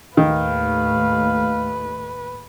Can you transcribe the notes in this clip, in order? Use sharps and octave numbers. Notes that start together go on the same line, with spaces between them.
D#2 A2 D#3 A3 B4 F5